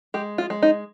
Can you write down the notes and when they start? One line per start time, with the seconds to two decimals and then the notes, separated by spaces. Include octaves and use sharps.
0.14 G#3 G4
0.38 F4
0.50 G#3
0.62 D#4